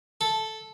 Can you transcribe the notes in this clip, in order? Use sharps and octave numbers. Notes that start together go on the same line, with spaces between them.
A4